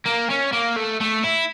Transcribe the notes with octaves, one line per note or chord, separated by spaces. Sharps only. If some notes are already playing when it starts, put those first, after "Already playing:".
A#3
C#4
A#3
A3
A3
E4